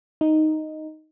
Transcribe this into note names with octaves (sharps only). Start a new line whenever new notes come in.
D#4